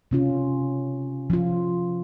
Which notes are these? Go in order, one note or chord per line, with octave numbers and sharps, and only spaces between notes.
C3 C#4 F4
F3 F4